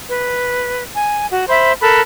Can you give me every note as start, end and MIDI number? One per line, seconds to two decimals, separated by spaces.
0.09 0.82 71
0.95 1.28 80
1.31 1.45 66
1.48 1.72 72
1.48 1.72 76
1.48 1.72 83
1.81 2.01 69
1.81 2.01 70
1.81 2.01 83
1.81 2.01 90